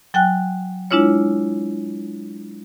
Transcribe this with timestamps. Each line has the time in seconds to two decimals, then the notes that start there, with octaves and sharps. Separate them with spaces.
0.14 F#3 G5 G#5 F#6
0.91 G#3 D4 E4 F4 C#5